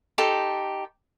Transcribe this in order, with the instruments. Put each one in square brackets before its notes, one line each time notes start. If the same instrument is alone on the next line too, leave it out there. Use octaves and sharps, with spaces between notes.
[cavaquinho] D#4 G4 A4 C6